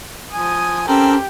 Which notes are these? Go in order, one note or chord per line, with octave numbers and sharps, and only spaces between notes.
F3 G#5 D#6
C4 C#4 G4 A4 A#4